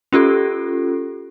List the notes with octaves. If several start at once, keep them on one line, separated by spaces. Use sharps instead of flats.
C#4 F4 G4 A4